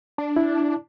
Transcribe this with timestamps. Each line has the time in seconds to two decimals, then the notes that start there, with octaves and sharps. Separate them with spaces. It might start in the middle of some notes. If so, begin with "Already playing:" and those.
0.18 D4
0.36 E4